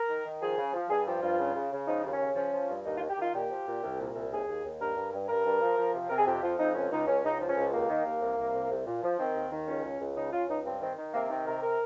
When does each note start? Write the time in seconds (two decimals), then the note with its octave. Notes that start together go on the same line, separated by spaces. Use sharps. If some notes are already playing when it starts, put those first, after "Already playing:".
Already playing: A#4
0.08 D#3
0.25 D#3
0.41 F3 G#4
0.57 C#3
0.74 F3
0.90 G2 G#4
1.06 F3 G4
1.22 G2 F4
1.39 C#3
1.55 C#3
1.71 C#3
1.87 F3 D#4
2.04 D#2
2.12 C#4
2.21 C#3
2.36 F3 C#4
2.53 F3
2.69 G2
2.85 D#2 D#4
2.97 F4
3.01 D#3
3.09 G4
3.17 D#3 F4
3.34 A#2 G4
3.50 F3
3.66 A#2
3.83 C2
3.99 A#2
4.15 C2
4.31 D#2 G#4
4.47 D#2
4.64 D#2
4.80 G2 A#4
4.96 G2
5.12 G2
5.29 G2 A#4
5.45 G2
5.61 F3
5.77 F3
5.94 C3
6.09 C3 A#4
6.17 G#4
6.26 F2 G4
6.42 F3 F4
6.59 F2 D#4
6.75 C#2 C#4
6.91 C#2 D#4
7.07 C#2 C#4
7.23 C#2 D#4
7.40 F3
7.48 C#4
7.56 C#2
7.72 D#2 A#3
7.88 D#3
8.05 D#2
8.21 C2
8.38 C2
8.53 C3
8.70 C2
8.87 A#2
9.02 F3
9.18 D#3 C4
9.34 D#2
9.51 D#3
9.68 C#2 C#4
9.84 C#2
10.00 C#2
10.16 C#3 D#4
10.32 C#3 F4
10.48 C#2 D#4
10.65 G2 C4
10.81 D#3 C4
10.97 D#3
11.13 C3 A#3
11.30 D#3 C4
11.46 C3 A#4
11.62 A#4